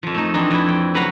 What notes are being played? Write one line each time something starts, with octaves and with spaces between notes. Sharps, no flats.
F2 F3
A3 D#4
E3 C4 D4 D#4
F2 E4
G5
C#3 F#3 B4 F#5 A#5 C6